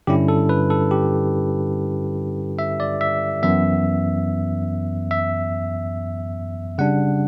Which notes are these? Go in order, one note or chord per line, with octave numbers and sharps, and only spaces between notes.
G2 D3 G3 C#4 E4 G4
A4
B4
A4
G4
E5
D5
E5
F#2 E3 B3 E5
E5
C#3 G3 D4 F#5